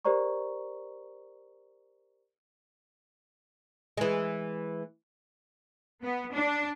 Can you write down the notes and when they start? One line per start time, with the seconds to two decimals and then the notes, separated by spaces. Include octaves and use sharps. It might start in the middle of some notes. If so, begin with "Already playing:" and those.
0.05 G4 A#4 C5 D5 A#5 C#6
3.97 E3 G#3
6.03 B3
6.33 D4